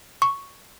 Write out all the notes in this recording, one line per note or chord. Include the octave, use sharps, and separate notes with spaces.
C#6